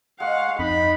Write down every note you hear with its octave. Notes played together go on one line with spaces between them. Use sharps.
G#3 F5 F#5 C#6
F2 D#4 D#5 B5